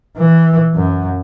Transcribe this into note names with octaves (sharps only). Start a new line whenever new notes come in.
E3
F#2